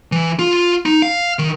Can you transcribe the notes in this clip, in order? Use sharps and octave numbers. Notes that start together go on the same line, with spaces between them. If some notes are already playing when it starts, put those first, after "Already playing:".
E3
F4
D#4
F5
D#3